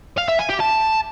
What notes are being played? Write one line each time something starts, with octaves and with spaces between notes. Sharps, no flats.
F5
E5
G#5
G4
A5